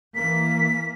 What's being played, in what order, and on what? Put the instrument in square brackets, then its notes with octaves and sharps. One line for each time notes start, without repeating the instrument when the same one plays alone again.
[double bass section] E3 A#3 [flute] B6